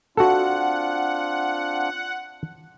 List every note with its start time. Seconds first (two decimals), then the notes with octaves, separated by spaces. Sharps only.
0.17 C4 D4 F4 F#4 A4 F#5